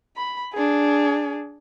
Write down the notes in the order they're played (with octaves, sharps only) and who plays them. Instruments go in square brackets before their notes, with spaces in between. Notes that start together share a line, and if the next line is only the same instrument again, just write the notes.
[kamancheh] B5
D4 G#4